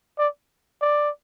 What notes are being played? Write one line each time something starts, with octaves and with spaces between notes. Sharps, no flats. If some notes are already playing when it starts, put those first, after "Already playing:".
D5
D5